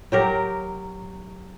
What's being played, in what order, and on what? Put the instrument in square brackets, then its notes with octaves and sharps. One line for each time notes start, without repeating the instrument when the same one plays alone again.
[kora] F#3 G4 A#4